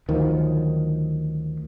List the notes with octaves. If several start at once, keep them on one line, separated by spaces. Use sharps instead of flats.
D2 D#3 F3 F#3